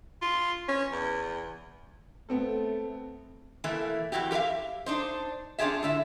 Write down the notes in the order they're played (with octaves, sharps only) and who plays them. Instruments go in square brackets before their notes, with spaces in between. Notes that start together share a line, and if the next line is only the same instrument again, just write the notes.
[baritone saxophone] F4
C#4
E2
[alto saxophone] A3 [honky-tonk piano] B3 C4 A4
[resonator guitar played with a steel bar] B2 E3 A3 A#3
F2 A#2 E3 F#4 G4
G4 A#4 B4 E5 F5
D4 D#4 C5
C#4 D4 F4 G4 G#4 E5
A2 D3 E5